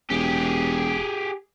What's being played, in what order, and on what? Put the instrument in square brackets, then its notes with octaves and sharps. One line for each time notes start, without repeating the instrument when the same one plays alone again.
[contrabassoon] E1 [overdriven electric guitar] G4 G#4